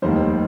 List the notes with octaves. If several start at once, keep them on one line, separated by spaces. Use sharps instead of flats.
F1 D#2 D#3 G3 C5
C5